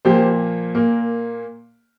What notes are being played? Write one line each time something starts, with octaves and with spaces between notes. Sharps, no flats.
A#2 F3 A#3 G4 C5
A#2 A#3 A#4